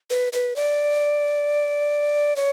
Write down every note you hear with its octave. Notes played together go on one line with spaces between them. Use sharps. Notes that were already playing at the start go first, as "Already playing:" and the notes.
B4
B4
D5
C#5